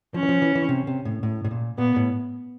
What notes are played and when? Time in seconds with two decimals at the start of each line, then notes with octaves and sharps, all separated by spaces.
0.14 F3 C#4
0.23 E3
0.29 F3
0.42 E3
0.55 E3
0.69 C3
0.87 C3
1.05 A2
1.23 A2
1.44 A2
1.51 A#2
1.78 A#2 B3
1.96 A2